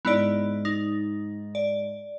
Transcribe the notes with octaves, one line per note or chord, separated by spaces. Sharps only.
G#2 B3 E4 D5
D#4
D5